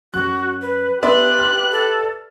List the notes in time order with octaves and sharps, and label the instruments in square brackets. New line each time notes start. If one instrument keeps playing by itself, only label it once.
[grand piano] F#2 [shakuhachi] F#4 [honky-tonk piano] F#6
[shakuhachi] B4
[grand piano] B3 [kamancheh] G4 F#6 [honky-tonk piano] B4 D5 E5 [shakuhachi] C6
[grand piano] F6
[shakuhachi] A4